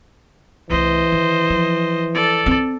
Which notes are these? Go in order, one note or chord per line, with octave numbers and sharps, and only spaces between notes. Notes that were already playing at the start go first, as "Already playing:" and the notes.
C2 E3 A3 C5 D#5
D#3
F3
A4 D5
C4 D4